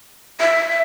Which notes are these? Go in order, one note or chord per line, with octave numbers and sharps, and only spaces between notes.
E5